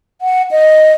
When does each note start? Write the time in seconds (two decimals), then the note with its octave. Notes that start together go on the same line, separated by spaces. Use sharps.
0.21 F#5
0.51 D#5